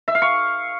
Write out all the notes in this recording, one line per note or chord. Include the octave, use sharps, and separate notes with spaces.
E5
F5
C#6